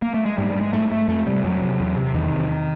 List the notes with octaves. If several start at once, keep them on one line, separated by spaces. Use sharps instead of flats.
A#3
A3
G#3
G#2 G3
G3
G#3
G#2 A3
A3
F2 A3
C3 G3
F2 F#3
C3
E2
C3
E2 D#3
C3